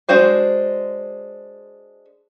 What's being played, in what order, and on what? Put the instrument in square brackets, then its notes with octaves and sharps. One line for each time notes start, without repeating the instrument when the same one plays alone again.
[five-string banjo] G#3 D4 F#4 C5 F5